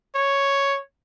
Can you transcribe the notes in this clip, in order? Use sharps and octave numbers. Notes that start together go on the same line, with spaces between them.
C#5